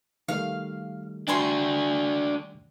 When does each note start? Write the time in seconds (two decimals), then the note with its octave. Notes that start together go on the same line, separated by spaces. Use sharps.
0.28 D#3 G3 A3 F5
1.28 D4 F#4 G5 G#5 C6